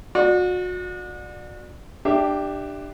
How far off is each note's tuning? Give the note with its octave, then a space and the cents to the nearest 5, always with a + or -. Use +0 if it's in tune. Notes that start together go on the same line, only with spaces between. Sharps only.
F#4 -35 D5 +25
D4 +25 G4 +0 E5 +0